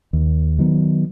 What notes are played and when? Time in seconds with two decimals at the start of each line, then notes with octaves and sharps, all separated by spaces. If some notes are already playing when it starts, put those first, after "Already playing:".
0.13 D#2
0.59 D#3 F#3 B3